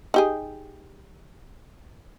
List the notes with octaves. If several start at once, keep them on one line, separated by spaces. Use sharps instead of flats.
D#4 G4 G#4